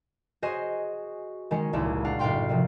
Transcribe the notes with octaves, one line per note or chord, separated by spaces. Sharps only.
F#4 G#4 C5 C#5 D#5 G#5
D#3 G#3 C#4 C#7
D#1 G#1 C#2 A#2 G#3 E4
D4 F5 F#5
F#1 A2 D4 F5 G5 C6
C3 D#3 F3